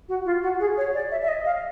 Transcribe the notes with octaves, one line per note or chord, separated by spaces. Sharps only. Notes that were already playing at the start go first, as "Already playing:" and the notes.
F#4
F4
F#4
G#4
C#5
D5
E5
E5
D#5
F5